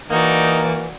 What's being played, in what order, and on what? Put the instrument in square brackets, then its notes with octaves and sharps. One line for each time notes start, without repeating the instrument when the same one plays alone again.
[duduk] E3 [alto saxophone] A#3 [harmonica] D#4 [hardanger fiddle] F#4 D5